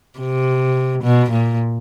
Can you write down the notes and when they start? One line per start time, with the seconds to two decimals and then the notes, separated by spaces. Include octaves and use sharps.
0.19 C3
1.03 B2
1.31 A#2